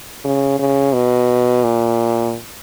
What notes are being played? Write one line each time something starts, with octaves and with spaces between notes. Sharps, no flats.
C#3
C#3
B2
A#2